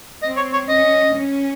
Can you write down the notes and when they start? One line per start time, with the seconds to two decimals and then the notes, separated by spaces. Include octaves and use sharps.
0.21 C4 D#5
0.36 C#5
0.53 C#5
0.68 C#4 D#5
1.14 C#4